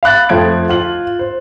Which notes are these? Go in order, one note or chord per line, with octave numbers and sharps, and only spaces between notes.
F5 B5 F#6 A6
F2 F3 A3 A5 G#6 D7
F4 F#7
C5